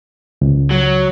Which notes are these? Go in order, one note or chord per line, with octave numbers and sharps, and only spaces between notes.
C#2
F#3